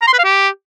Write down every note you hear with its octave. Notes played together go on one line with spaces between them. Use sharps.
A#5
C6
B4
F5
G4